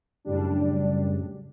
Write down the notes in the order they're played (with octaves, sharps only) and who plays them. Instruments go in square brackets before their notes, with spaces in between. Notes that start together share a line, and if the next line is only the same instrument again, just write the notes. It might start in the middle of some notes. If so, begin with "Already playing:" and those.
[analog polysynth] F#2 A2 C#3 G3 D4